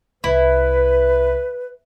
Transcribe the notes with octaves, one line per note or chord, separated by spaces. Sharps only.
C2 E4 B4